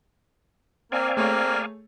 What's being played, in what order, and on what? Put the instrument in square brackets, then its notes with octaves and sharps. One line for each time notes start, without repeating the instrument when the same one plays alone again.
[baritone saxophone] A#3 [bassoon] C4 [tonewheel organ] D5 F5 G#5
[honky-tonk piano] A3 G#4 C#5 [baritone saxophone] A#3